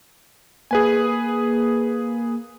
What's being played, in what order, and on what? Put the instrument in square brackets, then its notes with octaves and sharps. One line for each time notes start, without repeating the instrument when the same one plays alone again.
[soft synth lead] A#3 [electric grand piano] G#4 B4 G#5